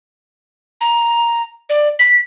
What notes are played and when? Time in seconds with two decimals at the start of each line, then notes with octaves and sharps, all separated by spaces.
0.81 A#5
1.70 D5
1.99 B6